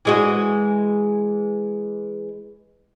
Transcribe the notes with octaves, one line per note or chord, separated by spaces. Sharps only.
E3 G#3 F#4